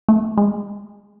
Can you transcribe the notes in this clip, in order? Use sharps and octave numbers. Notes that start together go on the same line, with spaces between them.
A3
G#3